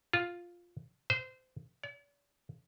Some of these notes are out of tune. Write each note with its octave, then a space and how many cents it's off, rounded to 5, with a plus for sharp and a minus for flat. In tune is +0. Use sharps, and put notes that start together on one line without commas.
F4 +0
C5 -25
D5 -45